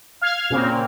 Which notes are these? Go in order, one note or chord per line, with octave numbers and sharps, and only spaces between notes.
F5 F6 G#6
A#2 C#3 A#3 C4